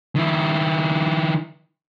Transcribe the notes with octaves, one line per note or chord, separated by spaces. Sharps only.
D#3 E4